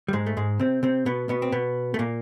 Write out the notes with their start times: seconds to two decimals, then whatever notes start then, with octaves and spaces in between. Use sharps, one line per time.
0.08 G3
0.13 G#2 G#3
0.26 A3
0.37 G#2 G#3
0.60 C3 C4
0.83 C3 C4
1.06 B2 B3
1.29 B2 B3
1.42 C4
1.52 B2 B3
1.94 A3
1.99 A#2 A#3